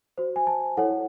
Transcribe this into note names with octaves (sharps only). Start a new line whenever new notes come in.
F#4 C5
G#5
A5
E4 A4 C#5 F#5